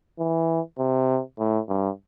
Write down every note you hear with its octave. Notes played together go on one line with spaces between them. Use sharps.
E3
C3
A2
G2